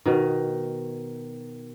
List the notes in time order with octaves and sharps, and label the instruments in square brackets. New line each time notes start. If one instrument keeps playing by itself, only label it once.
[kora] B2 D#3